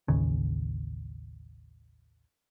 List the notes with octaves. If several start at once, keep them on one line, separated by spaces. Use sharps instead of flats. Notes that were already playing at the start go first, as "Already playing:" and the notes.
A1 D#2 C#3